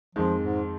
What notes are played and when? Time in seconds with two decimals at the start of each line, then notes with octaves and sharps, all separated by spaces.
0.15 F2 D#3 F3 G#3
0.42 G#2